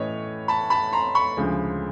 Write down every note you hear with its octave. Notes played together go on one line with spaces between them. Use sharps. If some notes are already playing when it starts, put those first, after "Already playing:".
Already playing: A2 E3 A3 C#4 B4 C#5 D#5
A5 B5
A5 B5
A#5 C6
B5 C#6
D2 C#3 F3 G#3